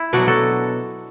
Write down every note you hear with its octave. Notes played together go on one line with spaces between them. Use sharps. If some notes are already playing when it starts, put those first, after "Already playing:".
Already playing: E4
B2 F#3 D4 F#4
F#4 A4